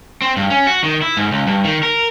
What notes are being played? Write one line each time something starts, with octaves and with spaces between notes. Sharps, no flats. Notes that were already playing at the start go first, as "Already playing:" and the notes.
C4
G2
C#4
F#4
D#3
E4
G#2
C#2
G2
D#3
A#4